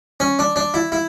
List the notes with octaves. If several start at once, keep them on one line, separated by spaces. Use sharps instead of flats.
C#4
D4
D4
E4
E4